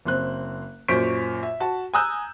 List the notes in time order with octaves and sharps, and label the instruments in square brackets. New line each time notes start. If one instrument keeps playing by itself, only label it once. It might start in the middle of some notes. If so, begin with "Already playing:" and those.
[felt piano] F#1 C4 F#6
F#2 A#2 C5 C#6 B6 D7
E5
F#4 A5
G#5 A#5 D#6 E6 F#6 G6